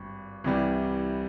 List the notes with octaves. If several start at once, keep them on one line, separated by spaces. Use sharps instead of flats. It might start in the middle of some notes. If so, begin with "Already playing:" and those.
Already playing: G#1 G2
C2 C3 E3 G3